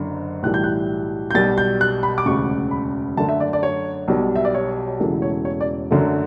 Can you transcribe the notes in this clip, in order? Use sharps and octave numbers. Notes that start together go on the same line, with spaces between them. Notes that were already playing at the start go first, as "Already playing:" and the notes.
Already playing: F#1 F#2 D3
B1 A2 E3 G3 F#6
G6
F#6
G6
B1 B2 G3 A6
G6
F#6
B5
D6
E1 D2 C#3 C#6
B5
F#2 D3 A3 A5
E5
D5
D5
C#5
B1 B2 G3
E5
D5
C#5
E1 E2 C#3 E3 A3
C#5
C#5
D5
F#2 D3 F#3 A3